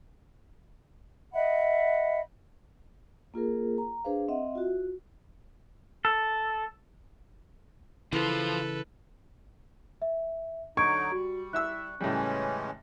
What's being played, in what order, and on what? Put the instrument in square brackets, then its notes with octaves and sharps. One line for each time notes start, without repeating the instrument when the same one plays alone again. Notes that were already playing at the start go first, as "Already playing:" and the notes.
[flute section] D#5 E5 F#5 B5
[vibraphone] A#3 F4 G#4 A#4
A#5
D4 G#4 B4 C5 F5
C4 D#5 E5 F#5
F4 F#4
[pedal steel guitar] A4
[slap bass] C#3 E3 [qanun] E4 [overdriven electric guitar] F4 C5 [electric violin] A4 B4
[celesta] E5
[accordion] D3 F#3 D#4 [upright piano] C#6 [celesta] G#6 D7
[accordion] G3 [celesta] F#4
[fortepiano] E4 E5 E6 [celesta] F#6
[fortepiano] A2 C#3 G3 [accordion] E3 G#3 C#4